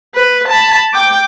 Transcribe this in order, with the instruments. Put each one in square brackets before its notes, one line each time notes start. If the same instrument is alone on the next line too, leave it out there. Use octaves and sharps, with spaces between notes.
[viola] B4
A5 B5
G5 D6